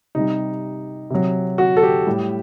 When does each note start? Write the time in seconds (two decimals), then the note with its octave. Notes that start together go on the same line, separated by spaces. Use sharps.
0.15 C3 G3 D#4
1.10 C3 F#3
1.58 F#4
1.77 A4
1.83 G4
2.07 A2 G3